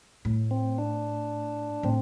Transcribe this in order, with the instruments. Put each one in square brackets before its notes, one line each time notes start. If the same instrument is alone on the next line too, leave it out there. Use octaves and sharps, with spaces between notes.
[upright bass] A2
[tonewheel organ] C4
D4
[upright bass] A2 [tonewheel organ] C4